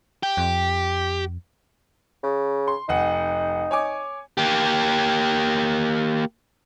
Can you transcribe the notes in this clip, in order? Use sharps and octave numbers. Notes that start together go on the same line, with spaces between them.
G4
F2
C#3
C6
F1 D#4 F#5
C#5 G#5 D6
A#3 G4